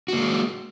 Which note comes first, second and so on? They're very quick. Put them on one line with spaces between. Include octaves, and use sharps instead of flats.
F#4 A#3 G#3